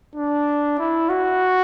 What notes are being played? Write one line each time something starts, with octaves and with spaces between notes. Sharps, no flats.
D4
E4
F#4